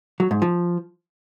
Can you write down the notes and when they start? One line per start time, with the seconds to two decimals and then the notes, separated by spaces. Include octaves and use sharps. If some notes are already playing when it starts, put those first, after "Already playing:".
0.20 F#3
0.31 G#2
0.42 F3